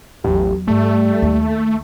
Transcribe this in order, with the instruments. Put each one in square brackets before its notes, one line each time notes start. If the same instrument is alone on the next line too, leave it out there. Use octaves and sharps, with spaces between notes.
[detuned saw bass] A1 [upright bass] E2 F#3 [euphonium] G4
[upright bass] G#2 [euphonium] G3 [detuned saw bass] A3
[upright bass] D#2